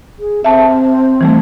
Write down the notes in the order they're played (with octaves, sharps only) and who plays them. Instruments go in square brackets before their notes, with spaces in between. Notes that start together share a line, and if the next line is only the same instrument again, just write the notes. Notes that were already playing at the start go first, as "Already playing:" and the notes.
[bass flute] G#4
[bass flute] C4 [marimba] E5 A5
[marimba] E3 G3 A3